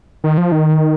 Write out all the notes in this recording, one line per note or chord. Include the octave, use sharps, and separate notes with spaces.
D#3
F3
D#3